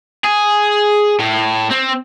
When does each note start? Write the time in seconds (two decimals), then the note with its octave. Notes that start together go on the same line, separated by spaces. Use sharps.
0.24 G#4
1.19 A2
1.70 C4